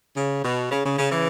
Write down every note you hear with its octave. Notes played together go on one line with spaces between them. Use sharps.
C#3
B2
C#3
C#3
C#3
C#3 E3